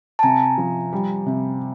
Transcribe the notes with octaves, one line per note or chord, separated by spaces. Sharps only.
A5
C3 G#5 A#5
F3
G3
C3